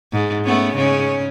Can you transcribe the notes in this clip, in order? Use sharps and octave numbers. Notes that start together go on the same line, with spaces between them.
G#2
A3 B3 C#4
G#2 C#3 C#4